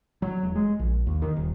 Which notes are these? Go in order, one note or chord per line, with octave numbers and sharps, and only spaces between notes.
F#3
E1
G#3
A#1
D#2
D#3
D#1